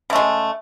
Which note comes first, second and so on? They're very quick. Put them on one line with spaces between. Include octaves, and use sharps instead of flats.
C#3 A3 G#3